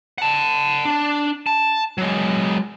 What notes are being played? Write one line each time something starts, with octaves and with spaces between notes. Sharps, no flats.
F#5 A5
D4
A5
F#3 G#3